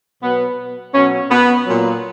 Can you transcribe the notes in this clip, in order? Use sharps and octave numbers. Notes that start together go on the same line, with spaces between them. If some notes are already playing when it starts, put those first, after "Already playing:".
B2 F#3 B3
B2 F#3 C#4
B3
A#2 F#3